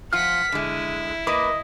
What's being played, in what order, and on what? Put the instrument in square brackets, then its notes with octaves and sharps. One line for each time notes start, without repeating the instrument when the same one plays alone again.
[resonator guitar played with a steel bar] F3 F4 [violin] F#5 B6 [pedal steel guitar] F6
[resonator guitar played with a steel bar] D3 G#3 [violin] E4
[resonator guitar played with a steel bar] A#3 B4 [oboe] D#5 [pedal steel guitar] B5 D6